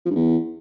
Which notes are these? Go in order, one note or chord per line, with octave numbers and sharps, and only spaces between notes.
F3
G2
E2